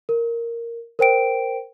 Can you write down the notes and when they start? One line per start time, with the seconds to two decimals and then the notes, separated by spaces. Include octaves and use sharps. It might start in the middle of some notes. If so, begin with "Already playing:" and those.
0.09 A#4
0.99 A#4 C5 G5 D7